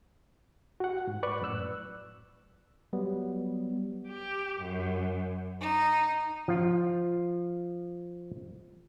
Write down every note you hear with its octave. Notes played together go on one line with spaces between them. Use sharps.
F#4 F#5
G#2
B4 D5 C#6 D6 F#6
F#2 A2 E6 F#6
F#3 G3 B3
G4
F#2
D#4
F3 F4